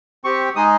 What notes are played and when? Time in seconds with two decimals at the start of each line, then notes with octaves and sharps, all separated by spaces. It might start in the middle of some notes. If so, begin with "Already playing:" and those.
0.24 C4 G4 C#6
0.56 G#3 D#4 G#4 D#6